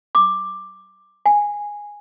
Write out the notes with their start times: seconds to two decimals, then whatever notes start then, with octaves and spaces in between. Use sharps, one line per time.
0.15 D6
1.26 G#5